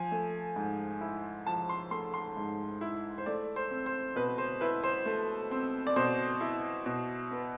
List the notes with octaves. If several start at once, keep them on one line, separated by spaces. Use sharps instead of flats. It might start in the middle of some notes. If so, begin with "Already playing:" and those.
Already playing: F3 G#5
A3
G#2
E4
F3 A5
C6
A3 C6
C6
G#2
E4
C5
A3 D5
C5
C4
C5
B2 B4
C5
E4 B4
C5
A3
C4
D5
B2 C5
E4
B2
B3